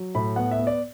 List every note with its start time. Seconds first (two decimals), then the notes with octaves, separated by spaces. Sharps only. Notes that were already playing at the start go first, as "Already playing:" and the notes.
Already playing: F#3
0.15 A2 B5
0.36 B3 F#5
0.51 E5
0.59 B3
0.67 D5